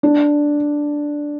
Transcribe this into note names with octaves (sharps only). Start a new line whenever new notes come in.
D4